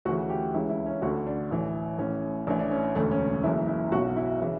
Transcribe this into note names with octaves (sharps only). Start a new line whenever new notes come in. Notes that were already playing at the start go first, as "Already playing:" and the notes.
D2 C#3 E3 F#4
G4
C#2 C#3 E3 E4
E4
C#4
D2 D3 F#4
D4
A1 A2 E3
A1 A2 E3 C#4
A1 A2 E3 D4
D4
C#4
E1 D2 D3 A3
C#4
F#1 F#2 C#3 E3 E4
E4
B1 B2 F#4
E4
C#3 E3